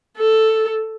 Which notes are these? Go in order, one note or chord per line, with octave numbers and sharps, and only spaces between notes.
A4